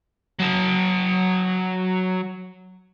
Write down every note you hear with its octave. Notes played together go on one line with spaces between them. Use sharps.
F#3 A5